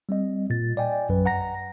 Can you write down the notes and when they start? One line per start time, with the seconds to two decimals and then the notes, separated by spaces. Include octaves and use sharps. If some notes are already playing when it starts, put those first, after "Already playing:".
0.09 G3 C4 D#5
0.50 A#2 A6
0.77 D5 D#5 G5 G#5
1.09 A#1 F#2 F#3 B4
1.26 F#5 A#5 A#6